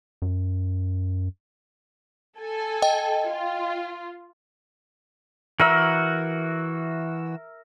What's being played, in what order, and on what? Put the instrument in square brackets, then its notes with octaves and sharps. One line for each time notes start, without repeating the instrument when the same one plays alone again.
[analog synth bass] F#2
[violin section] A4 G#5
[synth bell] D#5 G5
[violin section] F4
[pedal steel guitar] E3 F#4 E6 [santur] A#4 E5